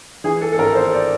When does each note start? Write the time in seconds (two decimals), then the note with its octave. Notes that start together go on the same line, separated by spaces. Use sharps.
0.24 E3 G#4
0.41 A4
0.53 A4
0.58 G#1 A#4
0.75 C5
0.93 D5